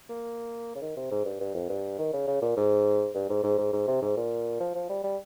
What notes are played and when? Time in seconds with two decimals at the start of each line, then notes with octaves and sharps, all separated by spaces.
0.09 A#3
0.75 C#3
0.81 D#3
0.96 C3
1.11 G#2
1.25 G2
1.40 G2
1.55 F2
1.69 G2
1.99 D#3
2.13 C#3
2.27 C#3
2.42 A#2
2.57 G#2
3.15 G2
3.29 G#2
3.44 G#2
3.58 G#2
3.73 G#2
3.88 C3
4.02 G#2
4.17 A#2
4.60 F3
4.75 F3
4.90 G3
5.04 G3